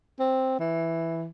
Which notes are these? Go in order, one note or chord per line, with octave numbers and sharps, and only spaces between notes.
C4
E3